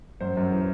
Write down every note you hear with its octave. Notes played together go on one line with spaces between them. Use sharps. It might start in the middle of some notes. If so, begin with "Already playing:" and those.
F#2 C5
F#2
E3